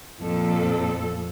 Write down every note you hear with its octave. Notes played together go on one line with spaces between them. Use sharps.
F2 A#2 A4